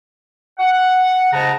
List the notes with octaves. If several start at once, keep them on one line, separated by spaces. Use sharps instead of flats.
F#5
G#2 C#3 A5 A#5